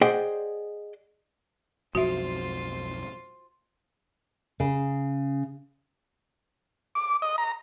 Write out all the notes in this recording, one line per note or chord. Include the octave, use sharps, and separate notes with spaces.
G#4 C5 D5 D#5 F#5 G5
B1 F2 G#2 F4 F#4 C5 E5
C#3
D6
D#5
A#5